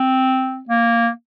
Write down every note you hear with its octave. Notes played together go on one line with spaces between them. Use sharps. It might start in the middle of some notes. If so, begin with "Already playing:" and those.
Already playing: C4
A#3